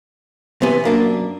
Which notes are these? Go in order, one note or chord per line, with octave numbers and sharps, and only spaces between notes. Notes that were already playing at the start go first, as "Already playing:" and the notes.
C3 E3 B3 G#5
F#2 A#3 D4